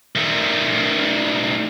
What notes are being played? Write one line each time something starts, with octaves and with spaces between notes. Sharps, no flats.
D#3 A3